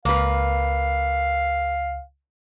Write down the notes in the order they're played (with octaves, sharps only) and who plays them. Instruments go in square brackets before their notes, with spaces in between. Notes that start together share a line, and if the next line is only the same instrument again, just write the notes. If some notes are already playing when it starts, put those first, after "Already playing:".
[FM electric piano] C#2 [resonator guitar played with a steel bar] A#3 B4 [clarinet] F5